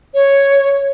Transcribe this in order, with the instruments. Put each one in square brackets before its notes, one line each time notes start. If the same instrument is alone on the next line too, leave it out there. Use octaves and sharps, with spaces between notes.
[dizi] C#5